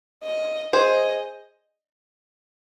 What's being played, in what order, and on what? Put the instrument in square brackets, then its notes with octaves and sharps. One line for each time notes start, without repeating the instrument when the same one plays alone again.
[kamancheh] D#5
[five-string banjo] G#4 C5 [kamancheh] D#5